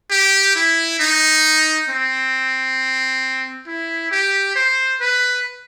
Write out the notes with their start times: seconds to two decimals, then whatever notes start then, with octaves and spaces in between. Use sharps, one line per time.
0.11 G4
0.55 E4
0.99 D#4
1.89 C4
3.67 E4
4.11 G4
4.56 C5
5.00 B4